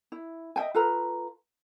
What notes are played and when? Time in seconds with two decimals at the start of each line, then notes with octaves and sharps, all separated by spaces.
0.12 E4
0.56 D#5 E5 G5 G#5
0.74 F4 A4 B4 A#5